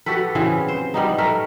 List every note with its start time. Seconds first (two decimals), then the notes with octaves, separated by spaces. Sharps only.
0.06 F#4 G4 A4 B4
0.35 C#3 E3 C4 G#4
0.68 C5
0.94 G3 B3 D#4
1.18 A3 A#4 B4